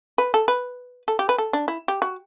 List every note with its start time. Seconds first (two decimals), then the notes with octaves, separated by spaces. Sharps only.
0.18 B4
0.34 A4
0.48 B4
1.08 A4
1.19 G4
1.29 B4
1.38 A4
1.53 D4
1.68 E4
1.88 G4
2.02 F#4